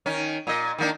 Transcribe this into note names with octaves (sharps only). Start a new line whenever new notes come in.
D#3 C#4
A#2 D#5
D#3 A#3 D4